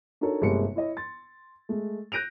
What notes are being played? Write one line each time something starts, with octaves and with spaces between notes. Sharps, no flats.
D4 D#4 F#4 A4 A#4 C#5
G1 C3 G#3 A#3 G#4 C#7
E4 C#5 D#5
C6 A6
G#3 A3
F#6 G6 A#6 D7 D#7 F7